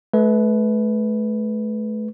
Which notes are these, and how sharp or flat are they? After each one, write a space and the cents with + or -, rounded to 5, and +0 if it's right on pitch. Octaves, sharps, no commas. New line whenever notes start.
A3 -35 B4 +0